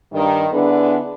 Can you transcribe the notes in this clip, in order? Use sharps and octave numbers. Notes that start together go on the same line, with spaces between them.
G2 D#3
D3 B3 D4 E4 G#4 B4